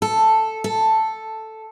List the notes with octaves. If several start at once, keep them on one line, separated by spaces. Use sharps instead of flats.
A4
A4